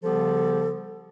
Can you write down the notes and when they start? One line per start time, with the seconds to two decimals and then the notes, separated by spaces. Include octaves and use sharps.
0.03 C#3 F3 G3 B3 G4 A4